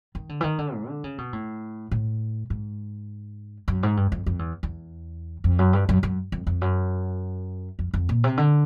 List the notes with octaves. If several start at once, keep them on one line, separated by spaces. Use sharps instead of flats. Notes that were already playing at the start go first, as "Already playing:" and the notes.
D#3
D3
E3
D#3
D3
G#2
D3
C#3
B2
A2
A2
G#2
F#2
G#2
G2
F2
F2
E2
E2
F2
F#2
G2
F#2
F#2
F2
F2
F#2
F2
F2
A#2
C3
D3